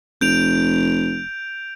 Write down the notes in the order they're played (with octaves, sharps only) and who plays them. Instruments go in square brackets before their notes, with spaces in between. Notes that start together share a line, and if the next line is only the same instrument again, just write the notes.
[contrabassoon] F1 [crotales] G6 D7 F7